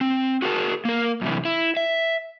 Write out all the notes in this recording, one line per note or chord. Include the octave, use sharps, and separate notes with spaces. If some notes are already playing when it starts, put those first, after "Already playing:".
C4
F#4 G#4 A#4 F5 A5
A#3 A#4
F#2 A2 C3 E3
E4
E5